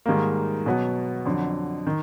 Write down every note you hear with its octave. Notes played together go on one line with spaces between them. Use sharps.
G#2 D#3 G3 A#3
B2 F#3 B3
F2 D3 F#3
D#3